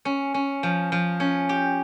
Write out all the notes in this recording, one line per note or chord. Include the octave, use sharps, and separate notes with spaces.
C#4
C#4
F3
F3
C#4
G4